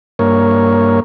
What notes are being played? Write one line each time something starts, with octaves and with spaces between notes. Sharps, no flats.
G2 A#3 A#4 C#5